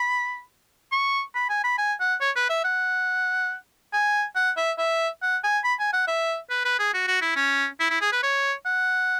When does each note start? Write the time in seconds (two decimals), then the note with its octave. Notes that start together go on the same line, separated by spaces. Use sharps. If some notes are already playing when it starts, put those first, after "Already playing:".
Already playing: B5
0.92 C#6
1.35 B5
1.50 G#5
1.64 B5
1.78 G#5
2.00 F#5
2.21 C#5
2.36 B4
2.50 E5
2.64 F#5
3.93 G#5
4.36 F#5
4.57 E5
4.79 E5
5.22 F#5
5.44 G#5
5.64 B5
5.80 G#5
5.93 F#5
6.08 E5
6.50 B4
6.65 B4
6.79 G#4
6.94 F#4
7.07 F#4
7.22 E4
7.36 C#4
7.80 E4
7.90 E4
8.01 G#4
8.12 B4
8.23 C#5
8.65 F#5